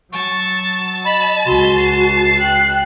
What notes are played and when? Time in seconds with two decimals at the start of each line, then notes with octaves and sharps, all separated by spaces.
0.12 F#3 A5 C#6
1.05 D#5 B5
1.46 C#2 F#4 C6
1.77 C7
2.39 G5 F#6